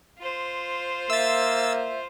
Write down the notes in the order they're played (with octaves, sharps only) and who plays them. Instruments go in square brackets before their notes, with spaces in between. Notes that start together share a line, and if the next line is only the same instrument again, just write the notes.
[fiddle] F4 C5
[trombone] A#3 [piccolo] E5 [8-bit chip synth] E6 A6